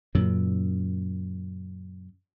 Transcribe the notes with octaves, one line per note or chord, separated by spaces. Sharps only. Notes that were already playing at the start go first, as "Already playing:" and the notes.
F#2 A#2 C#3